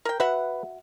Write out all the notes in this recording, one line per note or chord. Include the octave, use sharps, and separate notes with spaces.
A#4 G5
F#4 B4 E5 F#5